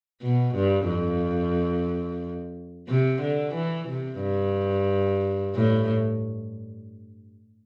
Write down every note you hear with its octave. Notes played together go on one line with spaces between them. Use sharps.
B2
G2
F2
C3
D3
E3
C3
G2
A2